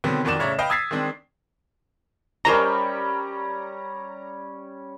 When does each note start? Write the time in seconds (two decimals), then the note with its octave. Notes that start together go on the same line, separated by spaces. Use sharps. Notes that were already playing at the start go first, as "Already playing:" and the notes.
0.04 B2 D3 D#3 F#3 B3 C4
0.25 F2 D#3 F#4 D5 E7
0.39 A2 C#3 C#5 D5 E5 A#5
0.58 B4 D#5 F5 G5
0.70 D#6 E6 G#6 A6 B6 C7
0.91 D#3 G#3 C4 D4
2.45 G3 C#4 A#4 C5 D#5 A#5 C#6